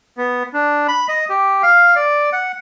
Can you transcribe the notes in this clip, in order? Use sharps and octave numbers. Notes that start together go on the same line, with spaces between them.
B3
D4
B5
D#5
G4
F5
D5
F#5